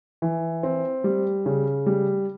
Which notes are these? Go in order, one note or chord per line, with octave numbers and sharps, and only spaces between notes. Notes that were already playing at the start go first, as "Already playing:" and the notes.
E3
C4
G3
C#3
G3